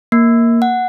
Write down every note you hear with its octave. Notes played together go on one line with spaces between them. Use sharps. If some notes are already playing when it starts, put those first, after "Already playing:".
A#3
F#5